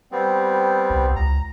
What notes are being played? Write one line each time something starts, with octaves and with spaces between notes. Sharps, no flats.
G3 B3 C4
C2
C#2 A#5